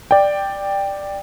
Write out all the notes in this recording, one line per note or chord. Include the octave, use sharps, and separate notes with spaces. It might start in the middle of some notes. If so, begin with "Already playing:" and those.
D5 G5